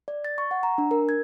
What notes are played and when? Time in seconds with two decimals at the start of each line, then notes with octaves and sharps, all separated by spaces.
0.08 D5
0.25 A6
0.38 C#6
0.51 F#5
0.63 A#5
0.78 D4
0.91 A#4
1.09 G#6